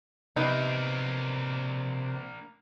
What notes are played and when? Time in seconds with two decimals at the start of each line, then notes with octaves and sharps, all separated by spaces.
0.36 C3 F#3 A#3 B3 D4 D#4